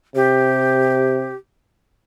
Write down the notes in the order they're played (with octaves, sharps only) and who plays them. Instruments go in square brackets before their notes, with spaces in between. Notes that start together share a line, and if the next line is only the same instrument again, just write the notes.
[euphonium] C3 [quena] G4